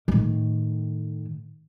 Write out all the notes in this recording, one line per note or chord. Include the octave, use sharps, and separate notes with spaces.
A2 D#3